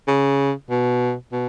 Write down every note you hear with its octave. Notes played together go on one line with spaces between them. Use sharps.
C#3
B2
B2